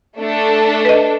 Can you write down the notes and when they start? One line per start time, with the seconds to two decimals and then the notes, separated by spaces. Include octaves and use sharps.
0.19 A3 D4 A4
0.85 B4 D#5